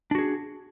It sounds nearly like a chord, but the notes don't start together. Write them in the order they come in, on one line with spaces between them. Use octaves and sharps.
D4 F#4 G#4